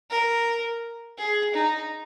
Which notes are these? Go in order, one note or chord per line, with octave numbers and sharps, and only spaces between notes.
A#4
G#4
D#4